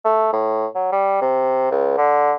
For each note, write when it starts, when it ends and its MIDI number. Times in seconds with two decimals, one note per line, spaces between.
0.05 0.33 57
0.33 0.67 45
0.75 0.88 54
0.92 1.20 55
1.21 1.69 48
1.71 1.97 37
1.98 2.33 50